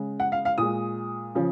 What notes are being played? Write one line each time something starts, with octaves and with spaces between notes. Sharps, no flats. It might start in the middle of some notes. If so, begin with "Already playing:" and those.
Already playing: C#3 G#3
F#5
F5
F5
A#2 G#3 D#6
C#3 F3